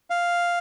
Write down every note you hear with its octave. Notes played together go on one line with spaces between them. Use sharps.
F5